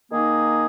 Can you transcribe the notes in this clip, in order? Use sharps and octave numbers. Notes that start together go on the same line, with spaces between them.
D#3 A#3 D#4 G#4